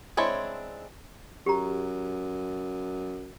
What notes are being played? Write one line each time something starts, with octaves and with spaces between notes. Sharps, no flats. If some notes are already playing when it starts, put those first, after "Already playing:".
G#3 C4 D4 E4 C#5
F#2 G4 A#5